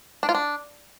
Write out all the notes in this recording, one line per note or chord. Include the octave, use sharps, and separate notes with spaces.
D4
F4
D4